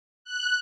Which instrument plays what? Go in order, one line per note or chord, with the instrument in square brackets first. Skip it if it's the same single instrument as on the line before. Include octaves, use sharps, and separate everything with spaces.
[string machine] F#6